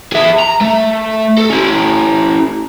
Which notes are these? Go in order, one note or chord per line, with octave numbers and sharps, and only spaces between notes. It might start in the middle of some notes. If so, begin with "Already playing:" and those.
G#4 E5
A#5
A3
A4
C#4 E4